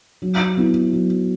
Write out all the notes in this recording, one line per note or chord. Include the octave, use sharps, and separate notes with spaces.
F#3
B3 E4
F#3